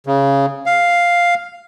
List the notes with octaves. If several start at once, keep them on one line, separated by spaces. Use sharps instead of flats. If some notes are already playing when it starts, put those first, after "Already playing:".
C#3
F5